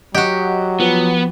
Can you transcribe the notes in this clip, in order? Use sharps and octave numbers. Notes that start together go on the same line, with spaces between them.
F#3 F#4 G4 D#5 F#5
F3 B3